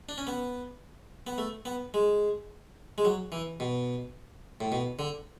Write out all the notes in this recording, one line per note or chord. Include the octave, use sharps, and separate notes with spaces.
D4
C#4
B3
B3
A3
B3
G#3
G#3
F#3
E3
B2
A2
B2
D3